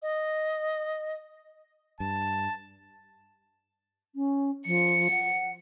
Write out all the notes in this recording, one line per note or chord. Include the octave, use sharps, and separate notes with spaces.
D#5
G2 A5
C#4
F3 C#7
F#5